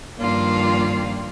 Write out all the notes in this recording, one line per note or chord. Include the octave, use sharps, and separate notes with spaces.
G2 D#3 F3 A#3 D4 F4